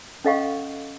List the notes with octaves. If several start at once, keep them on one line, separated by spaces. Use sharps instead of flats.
C#4 A4 D#5 F5 F#5 C#6